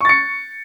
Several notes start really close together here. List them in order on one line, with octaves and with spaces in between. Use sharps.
C#6 A6 C#7